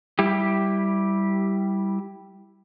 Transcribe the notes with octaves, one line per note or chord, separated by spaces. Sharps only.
G3 E4 G4